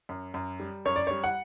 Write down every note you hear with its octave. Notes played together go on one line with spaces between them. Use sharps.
F#2
F#2
G3
F#2 C#5
D5
G3 C#5
F#5